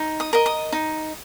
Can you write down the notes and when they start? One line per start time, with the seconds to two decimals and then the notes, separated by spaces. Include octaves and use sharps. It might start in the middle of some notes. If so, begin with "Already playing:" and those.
Already playing: D#4
0.20 D#6
0.33 A#4 D#5
0.46 D#6
0.72 D#4